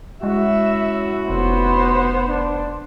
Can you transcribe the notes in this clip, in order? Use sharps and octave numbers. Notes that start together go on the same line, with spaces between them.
G#3 C#4 E4 F#4 E5
F1 B3 C5
D4